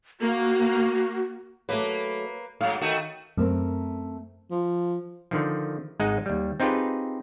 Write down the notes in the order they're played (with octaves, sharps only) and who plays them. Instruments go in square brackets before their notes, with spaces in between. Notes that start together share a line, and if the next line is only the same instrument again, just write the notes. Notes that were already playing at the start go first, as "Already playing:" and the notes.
[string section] A#3 [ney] F#4
[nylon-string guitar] F#3 A3 [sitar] A#3 B4
[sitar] G#2 F#3 [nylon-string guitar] F5
[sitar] D#3 A3 F#4
[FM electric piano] F#2 [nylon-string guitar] A3 C4 A#4
[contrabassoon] F3
[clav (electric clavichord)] D3 D#3 F3
G#1 G#3 D#4 D#5 F#5 G#5
D#2 G3
C4 D#4 F4 G4 G#4 B4